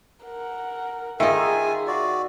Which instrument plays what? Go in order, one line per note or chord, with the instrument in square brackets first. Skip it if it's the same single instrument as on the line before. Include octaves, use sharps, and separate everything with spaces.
[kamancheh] A#4 F#5
[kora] D#3 D#4 [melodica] F4 G#5 [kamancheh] G#4 [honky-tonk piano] E5
[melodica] F#4 D5